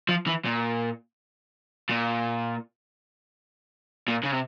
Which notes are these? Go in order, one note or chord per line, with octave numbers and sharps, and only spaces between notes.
F3
E3
A#2
A#2
A#2
C#3
C3